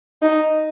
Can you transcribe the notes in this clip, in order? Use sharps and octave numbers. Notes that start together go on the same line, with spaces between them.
D#4